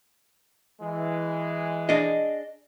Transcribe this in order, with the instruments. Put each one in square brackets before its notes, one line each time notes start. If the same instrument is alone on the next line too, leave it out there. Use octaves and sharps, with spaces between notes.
[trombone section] E3 G#3
[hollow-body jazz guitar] D4 G#4 [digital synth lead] D#5